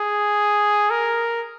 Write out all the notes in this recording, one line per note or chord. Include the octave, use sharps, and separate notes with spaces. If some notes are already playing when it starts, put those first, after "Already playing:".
Already playing: G#4
A#4